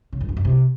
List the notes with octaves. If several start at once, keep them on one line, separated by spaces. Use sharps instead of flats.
C#3
F2
E2
F#2
C3